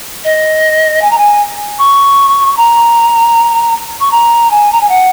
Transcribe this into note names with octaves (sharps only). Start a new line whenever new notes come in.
D#5
G#5
A#5
G#5
C#6
A#5
C#6
A#5
G#5
A#5
G#5
F#5